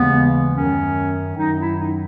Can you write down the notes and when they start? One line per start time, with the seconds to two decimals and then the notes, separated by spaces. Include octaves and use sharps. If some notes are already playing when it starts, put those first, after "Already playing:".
Already playing: D#2 C#3 E3 G#3 B3
0.54 F#2 D#3 F#3 C#4
1.35 F#2 D#3 F#3 D#4
1.57 E4
1.77 D#4